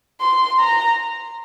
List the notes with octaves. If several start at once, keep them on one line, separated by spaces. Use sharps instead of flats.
C6
A#5